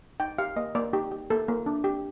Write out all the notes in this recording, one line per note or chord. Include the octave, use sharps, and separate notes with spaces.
D#4 G5
G4 F5
A#3 D#5
A#3 D5
D#4 G4
G4
A#3 A4
A#3
D4
G4